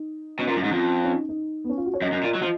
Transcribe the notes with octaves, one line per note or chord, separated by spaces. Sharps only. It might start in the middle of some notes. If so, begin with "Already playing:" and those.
Already playing: D#4
B2 C#4
A#2
F#2
G#2
F2
C#4
D#4
D#4
B3
C#4
F4
F#4
C#5
F#2 D#5
F#2
A#2
F#3
F3